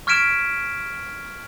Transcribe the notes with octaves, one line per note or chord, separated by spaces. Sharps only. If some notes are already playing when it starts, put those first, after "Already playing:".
C#6 F6 G#6 B6 D7 E7